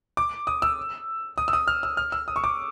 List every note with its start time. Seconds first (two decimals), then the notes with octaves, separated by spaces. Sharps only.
0.17 D6
0.47 D#6
0.62 E6
1.38 D#6
1.48 E6
1.53 D#6
1.68 F6
1.83 E6
1.97 F6
2.12 E6
2.28 D#6
2.36 C#6
2.44 D6